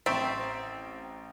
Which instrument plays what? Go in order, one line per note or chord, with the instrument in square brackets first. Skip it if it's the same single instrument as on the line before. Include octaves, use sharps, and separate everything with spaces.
[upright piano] A1 A#5 A6 [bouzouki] C4 [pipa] E5 G5 C#6